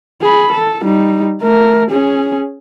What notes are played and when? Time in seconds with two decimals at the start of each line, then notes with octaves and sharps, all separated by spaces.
0.22 G#4 B5
0.52 A4
0.84 G3 D#4
1.41 A3 A#4
1.90 C#4 G#4